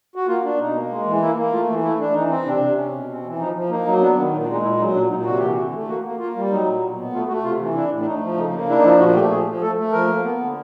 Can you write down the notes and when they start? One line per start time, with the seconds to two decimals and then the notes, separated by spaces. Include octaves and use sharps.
0.16 F#4
0.27 A#3 F4
0.43 D4
0.58 B2 D#4
0.74 A#3
0.89 G#3
1.05 E3
1.21 A#3 E4
1.36 A#3
1.52 A3 F4
1.67 E3
1.83 A3 E4
1.99 D4
2.14 E3 D#4
2.29 C4
2.45 C3 D4
2.60 C3
2.76 C#4
2.92 B2
3.08 C4
3.23 E3
3.39 F3 D#4
3.55 F3
3.69 A#3 D#4
3.85 F#3 D#4
4.01 B3 D4
4.16 D#3
4.32 A#2 D#4
4.42 D4
4.47 G#3
4.52 D#4
4.63 A#2 E4
4.79 F#3 D#4
4.94 A#2 D4
5.10 A#2 D#4
5.25 C3 F#4
5.39 E3 G4
5.52 D3 F#4
5.72 A3
5.87 A#3 F#4
6.04 A#3
6.19 A#3 F4
6.35 G3
6.50 F#3 D#4
6.66 A#2
6.81 B2
6.96 B3
7.12 A3 F4
7.28 A3 F#4
7.43 C3 F4
7.59 E3
7.74 D4 E4
7.91 A2
8.00 D4
8.05 A3 D#4
8.21 F3
8.36 C#3 D#4
8.53 A#3
8.68 D4 E4
8.77 D#4
8.83 F3 E4
8.99 A#2 F#4
9.14 A3 G4
9.30 F3 G#4
9.46 F3
9.61 A3 A4
9.77 A3
9.92 F3 A#4
10.08 A#3
10.23 B3
10.40 D3